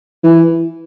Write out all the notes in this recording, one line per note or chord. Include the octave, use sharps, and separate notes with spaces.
E3